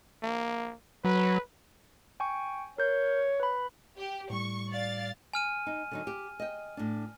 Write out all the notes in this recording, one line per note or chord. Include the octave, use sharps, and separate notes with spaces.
A#3
F#3 B4
G5 G#5 C#6
A#4 C#5 G6
B4 B5
G4
A2 G3 C#6
D5 F5 A6
G#5 F6 D#7
D#4
D3 F#3 D#4
G4
D#5 G5
A2 D4